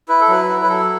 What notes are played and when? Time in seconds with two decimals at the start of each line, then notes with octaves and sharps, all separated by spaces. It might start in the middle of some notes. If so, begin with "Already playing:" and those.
0.09 E4 B4
0.21 A4
0.29 F#3 B4
0.49 E4
0.63 B4
0.69 F#3 A4